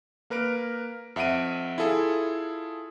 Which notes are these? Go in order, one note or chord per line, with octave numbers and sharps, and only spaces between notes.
A#3 A#4 B4 F6 D7
F2 E5 F#5 D7 D#7
E4 F4 G#4 A4